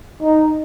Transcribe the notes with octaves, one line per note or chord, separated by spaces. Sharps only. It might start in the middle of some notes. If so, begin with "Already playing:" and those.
D#4